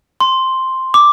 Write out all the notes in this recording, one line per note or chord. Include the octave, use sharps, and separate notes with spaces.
C6
D6